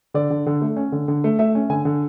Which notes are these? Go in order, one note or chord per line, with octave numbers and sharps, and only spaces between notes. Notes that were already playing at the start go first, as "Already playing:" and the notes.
D3 D5
D3
D3
A3
C#4
D3
D3
A3
A3 E5
C#4
D3 G#5
D3